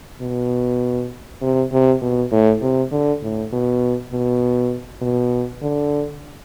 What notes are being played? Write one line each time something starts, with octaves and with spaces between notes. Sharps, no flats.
B2
C3
C3
B2
A2
C3
D3
A2
B2
B2
B2
D3